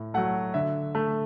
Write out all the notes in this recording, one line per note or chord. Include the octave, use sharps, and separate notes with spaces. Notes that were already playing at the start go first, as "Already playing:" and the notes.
Already playing: A2
F#3 A3 F#5
D3 E5
A3